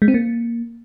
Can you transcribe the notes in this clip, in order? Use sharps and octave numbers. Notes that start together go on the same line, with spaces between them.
G#3
C4
A#3